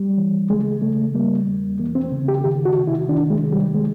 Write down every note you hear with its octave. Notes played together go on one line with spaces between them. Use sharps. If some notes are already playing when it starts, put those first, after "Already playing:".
Already playing: G3
E3
C#3 G#3
C#3 A3
G3 A#3
E2
E3 A#3
C4
C#3
G4
D#3 G4
F#4
C3
E4
D#3 D4
G#3
C3
G3
D#3 G#3